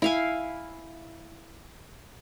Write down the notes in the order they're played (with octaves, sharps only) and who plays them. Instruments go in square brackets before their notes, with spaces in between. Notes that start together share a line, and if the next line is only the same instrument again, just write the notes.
[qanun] E4 F5 G#5